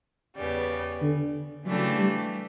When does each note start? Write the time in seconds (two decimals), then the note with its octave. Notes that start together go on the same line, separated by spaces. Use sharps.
0.37 E2 C#3 G3 B3
1.02 D3
1.65 C#3 E3 F#3 A3 D4 G4
1.97 G3